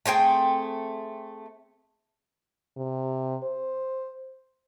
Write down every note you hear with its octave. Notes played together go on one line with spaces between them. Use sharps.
A3 C4 G#4 G5
C3
C5